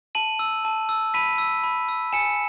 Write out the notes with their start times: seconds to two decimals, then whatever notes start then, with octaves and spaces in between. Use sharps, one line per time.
0.15 A5 D#7 F#7
0.39 E6
0.65 A5
0.89 E6
1.14 B5 B6 D#7
1.38 E6
1.64 B5
1.89 E6
2.13 G#5 C#7 E7